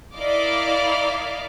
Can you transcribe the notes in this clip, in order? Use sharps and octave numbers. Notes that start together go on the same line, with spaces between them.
E4 A#4 D5 D#5 F5 D6